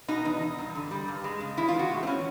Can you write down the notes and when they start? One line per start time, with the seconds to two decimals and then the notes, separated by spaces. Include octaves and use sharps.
0.08 B2 D#4
0.25 E2 D#4
0.42 E2
0.58 G2
0.75 D3
0.91 G3
1.08 G2
1.24 G#3
1.41 C#3
1.57 E2 E4
1.68 F4
1.75 G#3 F#4
1.91 A2
2.03 C4
2.07 E3 C#4